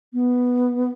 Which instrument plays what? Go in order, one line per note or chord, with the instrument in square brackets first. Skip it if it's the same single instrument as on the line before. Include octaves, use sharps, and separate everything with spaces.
[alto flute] B3